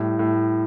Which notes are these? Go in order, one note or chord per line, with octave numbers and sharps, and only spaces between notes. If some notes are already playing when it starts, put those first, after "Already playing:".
Already playing: A2 G3
A2